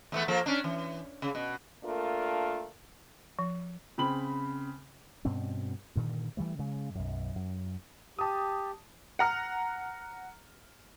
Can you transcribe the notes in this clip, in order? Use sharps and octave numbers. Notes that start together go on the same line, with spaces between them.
E2 A3 B3
F3 A#3 A4
C#4 D4
E3
C#3
B2
A3 A#3 D4 F4 A#4
F3
C#3 C4 B5 F#7
G2 B2 C4 C#4
G2 A#2 D3 D#3
E3 F3 G3 A3
C#3 G#3
B1 F#2
F#2
G4 A5 D#6
F#5 A#5 F6